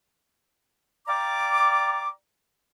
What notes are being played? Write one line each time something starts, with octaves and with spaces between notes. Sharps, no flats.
D5 F5 G5 A#5 D6